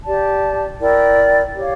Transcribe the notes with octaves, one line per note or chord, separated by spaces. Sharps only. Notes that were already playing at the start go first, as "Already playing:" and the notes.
G4 D5 A5
E4 A#4 D5 G5
G4 C#5 F5